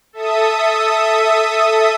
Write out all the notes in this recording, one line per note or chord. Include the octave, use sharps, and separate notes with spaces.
A4 E5 D#6